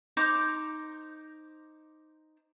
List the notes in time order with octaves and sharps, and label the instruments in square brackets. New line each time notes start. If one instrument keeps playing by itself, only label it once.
[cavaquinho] D#4 C5 A#5 D6